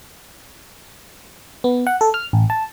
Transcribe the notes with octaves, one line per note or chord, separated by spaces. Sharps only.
B3
F#5
A4
F6
A1
A5